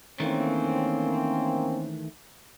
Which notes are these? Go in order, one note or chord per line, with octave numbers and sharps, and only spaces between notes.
D#3 E3 A3 A#3 C4 C#4